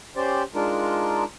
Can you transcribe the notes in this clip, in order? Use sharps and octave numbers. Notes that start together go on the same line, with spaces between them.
C#4 G4 C5 D5
G#3 D4 D#4 F4 A#4